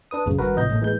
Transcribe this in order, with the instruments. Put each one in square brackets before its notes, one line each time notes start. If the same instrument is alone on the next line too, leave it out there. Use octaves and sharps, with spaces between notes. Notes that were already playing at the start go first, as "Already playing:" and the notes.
[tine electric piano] D4 B4 D#6
[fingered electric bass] A1 F#2 F#3 [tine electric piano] C#3
[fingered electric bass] G#1 G2 [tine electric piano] F#4 A#4 B4
[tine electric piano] A1 D#5 G6 [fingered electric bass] A2 C3 F3
[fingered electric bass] A2 G3 A#3
[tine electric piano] E3 G#3 G6